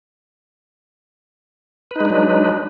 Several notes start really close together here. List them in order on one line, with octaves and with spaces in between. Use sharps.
B4 D#4 G#3 D4 F#3